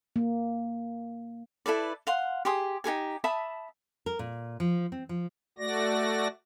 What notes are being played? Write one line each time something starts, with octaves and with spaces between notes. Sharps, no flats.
A#3
E4 A4 B4 D5
F5 F#5 C6
G4 G#4 C6 D#6
D#4 G4 G#4 G#5
E5 A5 B5 D#6
A#4
A#2
F3
C4
F3
A3 F#4 D5 A#6